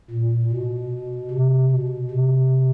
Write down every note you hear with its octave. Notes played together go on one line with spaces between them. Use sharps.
A#2
B2
C3
B2
C3